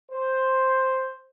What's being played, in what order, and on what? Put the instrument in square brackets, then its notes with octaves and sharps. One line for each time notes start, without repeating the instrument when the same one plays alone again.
[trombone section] C5